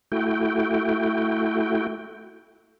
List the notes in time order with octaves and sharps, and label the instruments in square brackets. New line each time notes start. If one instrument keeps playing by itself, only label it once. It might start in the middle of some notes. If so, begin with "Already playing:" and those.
[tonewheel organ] A3 E4 F#4 G5